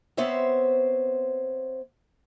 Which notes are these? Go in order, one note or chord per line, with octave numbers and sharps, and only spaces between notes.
B3 C4 C5 C#5 E5